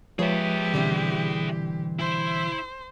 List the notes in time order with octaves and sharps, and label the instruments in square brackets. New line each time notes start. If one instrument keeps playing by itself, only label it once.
[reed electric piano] F3 G#3 B4 [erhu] G4 [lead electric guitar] G#4 E5 [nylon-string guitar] C#5
[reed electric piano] B2 D3 [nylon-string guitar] E3 G3 C4
[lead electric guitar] E4 [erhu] C5